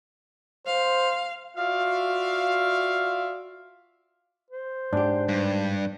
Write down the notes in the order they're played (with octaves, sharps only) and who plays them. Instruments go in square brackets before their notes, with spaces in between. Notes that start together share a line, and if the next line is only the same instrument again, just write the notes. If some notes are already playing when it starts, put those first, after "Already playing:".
[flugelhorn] C5 [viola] F5
[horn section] F4 F#4 D5 E5 F5
[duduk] C5
[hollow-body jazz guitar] G#2 G4 [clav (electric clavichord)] D4
[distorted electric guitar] G2